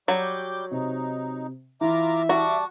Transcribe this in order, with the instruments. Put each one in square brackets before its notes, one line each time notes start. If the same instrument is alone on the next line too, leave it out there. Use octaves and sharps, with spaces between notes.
[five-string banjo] F#3 [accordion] G3 D6 G6
[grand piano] C3 [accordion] D#4
[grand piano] E3 [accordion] F4 A#5 D6 [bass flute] E5
[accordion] G3 A5 D6 [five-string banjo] F#4